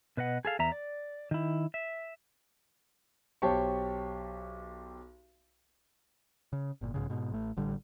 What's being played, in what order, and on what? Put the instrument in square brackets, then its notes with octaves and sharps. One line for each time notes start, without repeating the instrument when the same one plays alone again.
[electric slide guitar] B2 B4 D#5 F#5
G#4 A4 F5
E2 E5 A#5
D5
D#3 E4
E5
[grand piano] B1 G4 C5 C#5 A5 C#6
[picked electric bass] C#3
G1 A#2
B1 G#2 C#3
G#2 B2
A1 A3
A1 D3 G3